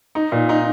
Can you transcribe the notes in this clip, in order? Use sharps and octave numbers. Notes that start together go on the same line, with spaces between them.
D#4
A#2
D#4